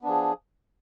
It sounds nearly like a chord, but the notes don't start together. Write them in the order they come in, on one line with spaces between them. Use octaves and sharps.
B3 D4 F3 G#4